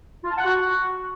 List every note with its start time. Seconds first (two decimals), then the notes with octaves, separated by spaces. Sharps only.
0.24 F4
0.31 A5
0.38 F#5
0.45 F#4